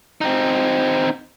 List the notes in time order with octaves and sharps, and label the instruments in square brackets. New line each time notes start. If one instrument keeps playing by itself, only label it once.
[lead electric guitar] C4 D#4